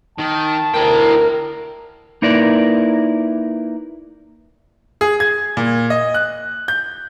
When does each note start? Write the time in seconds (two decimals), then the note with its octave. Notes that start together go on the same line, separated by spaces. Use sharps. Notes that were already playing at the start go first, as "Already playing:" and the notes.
0.18 D#3 A5
0.74 D2 E4 A#4 G5
2.22 A#3 D#4 E4 A#4 B4 D5
5.01 G#4
5.20 G#6
5.57 A#2
5.90 D#5
6.14 F#6
6.68 G6